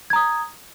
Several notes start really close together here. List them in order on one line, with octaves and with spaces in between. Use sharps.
G#6 A#5 D#6